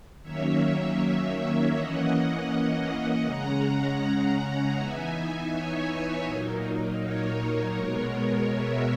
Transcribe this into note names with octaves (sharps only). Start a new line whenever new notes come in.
D#3 F#3 A#3 C#4 C#5 E5
E3 A#3 C#4 D#5 F#5
C#3 G#3 C#4 F#5 A#5
E3 B3 D#4 E5 G#5
C#5 E5
A#2 F#3 A#3 D#4
A#4 C#5
B2 G#3 B3
C#5 E5